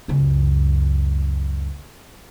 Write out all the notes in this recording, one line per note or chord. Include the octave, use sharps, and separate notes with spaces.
C#2 F#2